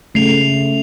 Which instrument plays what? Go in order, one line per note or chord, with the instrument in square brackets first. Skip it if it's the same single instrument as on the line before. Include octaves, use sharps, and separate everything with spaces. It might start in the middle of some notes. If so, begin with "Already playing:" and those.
[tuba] C#3 [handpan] A3 [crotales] C7 F7